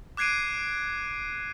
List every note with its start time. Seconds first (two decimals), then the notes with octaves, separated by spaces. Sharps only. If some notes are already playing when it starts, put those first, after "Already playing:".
0.17 D6 F#6 G#6 C7 D7 D#7